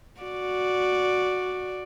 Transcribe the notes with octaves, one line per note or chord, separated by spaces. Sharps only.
F#4 D5